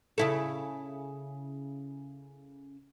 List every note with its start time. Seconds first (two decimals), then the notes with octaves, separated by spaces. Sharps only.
0.18 C#3 E4 A4